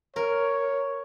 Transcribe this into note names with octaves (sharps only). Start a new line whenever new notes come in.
A#4 C#5